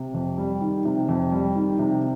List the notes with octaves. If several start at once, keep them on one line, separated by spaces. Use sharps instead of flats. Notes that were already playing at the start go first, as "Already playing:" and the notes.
Already playing: C3
F2
G3
D#3
C3
F2
G3
D#3
C3